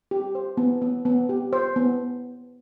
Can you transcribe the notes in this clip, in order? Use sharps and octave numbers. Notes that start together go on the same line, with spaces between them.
G4
C5
B3
B3
B3
G4
C5
B3